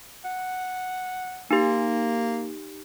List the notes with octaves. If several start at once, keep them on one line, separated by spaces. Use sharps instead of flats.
F#5
A#3 D#4 G4